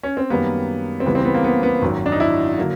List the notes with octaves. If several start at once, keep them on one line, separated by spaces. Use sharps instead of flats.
C#4
C4
F#2 D#3 G3 A#3 B3
C4
C#2 C#3 E3 G3 B3
C4
B3
A#3
B3
B3
G#1 F#2 D#3 F#3
D4
D#4
E4
D3 F#3 A#3